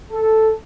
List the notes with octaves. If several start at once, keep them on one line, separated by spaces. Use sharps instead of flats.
A4